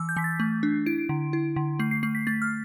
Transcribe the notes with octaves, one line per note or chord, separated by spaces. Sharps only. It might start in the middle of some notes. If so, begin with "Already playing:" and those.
Already playing: E3 E6
G6
E3 B6
A6
A3
D4
E4 D7
D3
E4
D3
A3 C7
C7
A3 C7
B6
A3 A6
F6